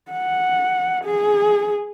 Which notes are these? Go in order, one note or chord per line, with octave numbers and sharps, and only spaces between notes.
F#5
G#4